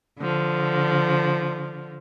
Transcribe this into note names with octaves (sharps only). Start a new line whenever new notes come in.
D3 F3